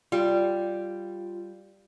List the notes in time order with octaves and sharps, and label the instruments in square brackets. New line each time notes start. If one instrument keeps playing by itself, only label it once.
[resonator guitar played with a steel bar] G3 [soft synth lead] F4